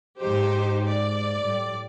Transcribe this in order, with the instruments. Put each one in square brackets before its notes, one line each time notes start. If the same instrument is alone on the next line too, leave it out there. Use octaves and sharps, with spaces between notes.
[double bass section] G#2 [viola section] D#4 G4 C5
[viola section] D5
[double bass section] A2 G3